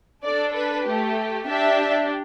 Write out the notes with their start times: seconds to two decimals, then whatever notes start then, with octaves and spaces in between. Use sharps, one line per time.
0.23 D4 A4 D5
0.54 B4
0.85 A3 G4
1.46 D4 G4 E5